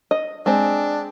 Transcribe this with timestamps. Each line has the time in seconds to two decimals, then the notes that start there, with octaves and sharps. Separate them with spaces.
0.11 D#5
0.46 G#3 C4 D4